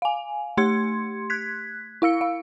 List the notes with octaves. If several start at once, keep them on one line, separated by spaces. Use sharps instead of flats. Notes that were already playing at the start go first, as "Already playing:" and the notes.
F5 G#5
A3 G4 C6 G#6 C#7
F#6 G#6 B6
E4 F5 E6 C#7
F5